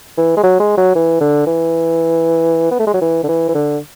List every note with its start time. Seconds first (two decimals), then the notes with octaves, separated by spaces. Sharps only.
0.18 E3
0.37 G#3
0.43 F#3
0.60 G#3
0.77 F#3
0.96 E3
1.21 D3
1.47 E3
2.71 B3
2.79 A3
2.87 G#3
2.94 F#3
3.02 E3
3.24 D3
3.28 E3
3.49 E3
3.55 D3